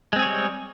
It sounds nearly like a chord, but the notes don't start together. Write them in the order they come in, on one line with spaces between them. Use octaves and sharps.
G#3 C4 G#4 C#5 G3